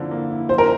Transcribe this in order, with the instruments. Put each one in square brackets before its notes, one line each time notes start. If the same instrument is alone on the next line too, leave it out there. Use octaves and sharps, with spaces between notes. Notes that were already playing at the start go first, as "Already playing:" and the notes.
Already playing: [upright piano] D3 F3 A#3 E4
A#3
E4
[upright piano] F3 [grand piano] C5
[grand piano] A#4